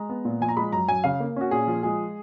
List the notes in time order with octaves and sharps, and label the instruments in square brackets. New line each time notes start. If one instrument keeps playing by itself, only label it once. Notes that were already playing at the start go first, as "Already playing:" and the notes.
Already playing: [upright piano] G#3 A#5
B3
A#2
F3 G#5
A#5
G#3 B5
F#2 A#5
F#2 G#5
C#3 F5
A#3
C#4 F#4
A#2 G#4
F3
G#3 G#4